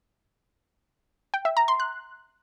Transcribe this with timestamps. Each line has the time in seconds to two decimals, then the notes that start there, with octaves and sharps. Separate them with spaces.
1.34 G5
1.45 E5
1.57 A#5
1.68 C6
1.80 F#6